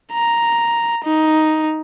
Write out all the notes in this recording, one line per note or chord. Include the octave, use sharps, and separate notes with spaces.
A#5
D#4